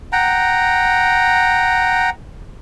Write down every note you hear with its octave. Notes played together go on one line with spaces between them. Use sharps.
F#5 G5 A#5